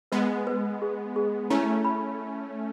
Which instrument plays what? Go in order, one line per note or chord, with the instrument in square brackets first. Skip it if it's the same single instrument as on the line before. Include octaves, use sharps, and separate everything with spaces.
[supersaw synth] G#3 B3 [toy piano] B4
[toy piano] B4
G#4
G#4
[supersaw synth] A3 C#4 [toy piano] E4
[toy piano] B5